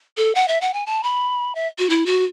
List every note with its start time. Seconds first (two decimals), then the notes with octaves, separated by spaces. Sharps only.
0.17 A4
0.35 F#5
0.48 E5
0.61 F#5
0.73 G#5
0.86 A5
1.03 B5
1.55 E5
1.78 F#4
1.89 E4
2.06 F#4